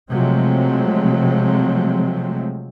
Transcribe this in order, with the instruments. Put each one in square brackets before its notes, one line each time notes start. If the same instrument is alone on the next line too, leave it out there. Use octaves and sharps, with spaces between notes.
[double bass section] C3 F3 F#3 G#3 A3 C4